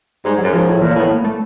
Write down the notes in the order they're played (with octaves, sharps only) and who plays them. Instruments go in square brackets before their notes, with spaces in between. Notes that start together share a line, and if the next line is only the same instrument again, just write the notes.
[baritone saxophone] G#2 [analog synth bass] G3
[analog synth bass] F#3
[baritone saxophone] F#2
[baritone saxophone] G#2 [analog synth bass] F3
[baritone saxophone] A2
[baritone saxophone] A#2 [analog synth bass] E3
[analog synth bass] A#3
[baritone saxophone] A2 [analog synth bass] B3
[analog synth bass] A#3
A3